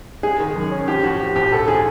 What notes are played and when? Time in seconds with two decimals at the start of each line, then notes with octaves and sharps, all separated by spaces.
0.23 G#3 G#4
0.40 D#3
0.56 F#2
0.71 C#4
0.88 F3 G4
1.03 A2 F#4
1.19 F3 G4
1.36 A#1 G4
1.52 D2 A4
1.68 F3 G#4